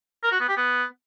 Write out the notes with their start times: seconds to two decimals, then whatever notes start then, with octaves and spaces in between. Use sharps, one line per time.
0.23 A#4
0.32 F#4
0.40 B3
0.49 G4
0.57 B3